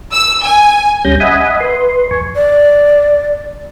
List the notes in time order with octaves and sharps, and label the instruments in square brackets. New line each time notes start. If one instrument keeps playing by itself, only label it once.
[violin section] E6
G#5
[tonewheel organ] D2 G3 C#4 G6 A#6
D#5 E5 F#5 G#5 B5 D#6
B4 C6
F2 G#5 C#6
[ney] D5